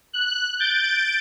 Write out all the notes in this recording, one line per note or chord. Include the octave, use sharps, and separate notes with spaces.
F#6
G6 A6 D7